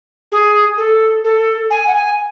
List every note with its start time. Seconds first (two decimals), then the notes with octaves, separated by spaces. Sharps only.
0.31 G#4
0.77 A4
1.24 A4
1.70 G#5
1.87 F#5
1.93 G#5